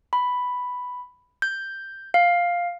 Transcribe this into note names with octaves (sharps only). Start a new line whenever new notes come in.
B5
G6
F5